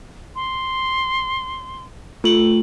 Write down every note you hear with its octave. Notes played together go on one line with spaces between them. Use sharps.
C6
A3 F4 F#7